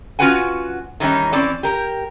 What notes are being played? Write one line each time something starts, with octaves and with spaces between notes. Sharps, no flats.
C#4 F4 F#4 B4 F#5 G#5
D#3 E3 G3 C#4 D#4
E3 C4 C#4 D5
G4 A#4